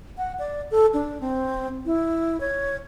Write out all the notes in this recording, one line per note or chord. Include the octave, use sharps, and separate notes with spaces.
F#5
D5
A4
D4
C4
E4
C#5